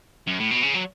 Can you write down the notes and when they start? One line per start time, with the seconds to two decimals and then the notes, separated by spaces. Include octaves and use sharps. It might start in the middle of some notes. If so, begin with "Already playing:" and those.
0.27 F#2
0.39 A2
0.51 B2
0.63 C#3
0.74 F#3